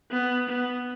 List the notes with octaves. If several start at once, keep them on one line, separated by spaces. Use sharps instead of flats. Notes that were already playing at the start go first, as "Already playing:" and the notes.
B3
B3